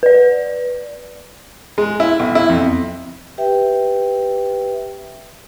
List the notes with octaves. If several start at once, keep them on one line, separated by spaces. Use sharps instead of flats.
B4 D5
G#3
E4
B1
E4
F2
G4 B4 E5 G5